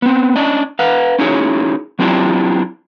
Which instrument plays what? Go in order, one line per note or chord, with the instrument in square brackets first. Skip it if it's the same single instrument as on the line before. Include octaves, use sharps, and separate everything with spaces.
[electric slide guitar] B3 C4
C#4 D4 D#5
B4 F5 F#5
C#4 D#4 E4 F#4 G#4 C#5
F#3 C4 D4 E4 F4 G4